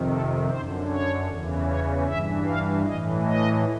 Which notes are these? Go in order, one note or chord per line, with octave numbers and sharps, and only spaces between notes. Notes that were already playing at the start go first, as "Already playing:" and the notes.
Already playing: F2 C3 D#3
A4
F#2 D3 C5
C#5
E2 C#3 E3
C#5
G2 E3 E5
F5
A2 E3 D#5
D#5